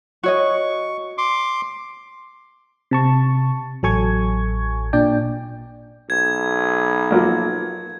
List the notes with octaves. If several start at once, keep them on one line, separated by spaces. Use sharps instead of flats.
F#4 C#5 D#5 C#6
C6 D6
C3 A5 C#6
A1 F#3 A4 G#5 C#6 G#6
A#2 D4 D5 G5
B1 G#6
F3 F#3 A#3